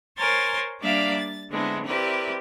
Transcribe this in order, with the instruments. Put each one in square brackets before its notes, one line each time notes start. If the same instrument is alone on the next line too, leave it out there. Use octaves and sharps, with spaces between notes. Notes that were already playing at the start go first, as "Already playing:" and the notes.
[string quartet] A#4 C5 C#5 G#5 C6 A6
G3 A#3 D4 D5 E5 F5
A6
D3 G#3 B3 C4 D4 E4
C4 E4 G4 A#4 B4 D5